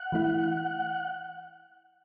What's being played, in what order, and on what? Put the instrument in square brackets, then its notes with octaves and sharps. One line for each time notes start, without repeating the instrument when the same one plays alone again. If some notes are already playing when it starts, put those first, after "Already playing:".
Already playing: [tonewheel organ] F#5
[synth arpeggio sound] E3 A3 E4